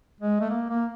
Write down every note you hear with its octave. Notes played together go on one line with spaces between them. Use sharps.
G#3
A3
A#3
A#3